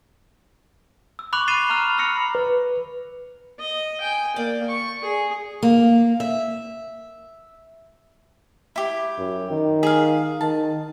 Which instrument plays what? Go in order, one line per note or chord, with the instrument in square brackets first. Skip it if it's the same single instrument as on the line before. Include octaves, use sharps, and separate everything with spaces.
[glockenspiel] E6
B5 C#6 D6 F#6 F7 F#7
D6 A6 C7 D#7 E7 G7
A#5 B5 F6 F7
B5 E6 F6 A#6 C#7
[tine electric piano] B4
[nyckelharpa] D#5
G5 G#5
[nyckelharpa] A#3 [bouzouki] D5 G5
[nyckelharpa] C#6
G#4
[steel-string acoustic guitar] A#3
E5
[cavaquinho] E4 G4
[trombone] F#2
D#3
[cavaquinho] G#4 F5
[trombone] D#3 [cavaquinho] A5